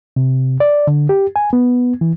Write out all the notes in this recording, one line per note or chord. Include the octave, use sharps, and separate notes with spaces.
C3
D5
D3
G4
G#5
B3
E3